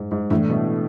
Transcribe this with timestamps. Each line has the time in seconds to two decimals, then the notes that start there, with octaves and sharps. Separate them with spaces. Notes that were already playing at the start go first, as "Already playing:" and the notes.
Already playing: G#2
0.11 G#2
0.30 A2 E3 A3 D4
0.50 B2